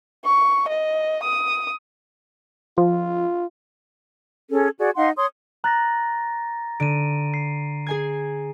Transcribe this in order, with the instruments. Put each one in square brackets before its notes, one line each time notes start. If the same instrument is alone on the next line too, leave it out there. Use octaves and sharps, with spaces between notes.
[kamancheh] C#6
D#5
D#6
[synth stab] F3 [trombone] F4
[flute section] C#4 G#4 A4
F#4 G#4 D5
D#4 F5 F#5 C6
C#5 C6 D#6
[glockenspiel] A#5 A6 A#6 [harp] F#6
[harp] D3 [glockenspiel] D7 D#7
[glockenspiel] C7
[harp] G#4 G#5 G#6